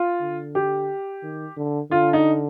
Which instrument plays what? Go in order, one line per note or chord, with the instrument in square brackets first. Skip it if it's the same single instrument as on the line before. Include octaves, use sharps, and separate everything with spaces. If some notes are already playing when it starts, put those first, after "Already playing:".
Already playing: [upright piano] F4
[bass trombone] D3
[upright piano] G4
[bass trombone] D#3
D3
[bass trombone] D3 [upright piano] F4
[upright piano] D#4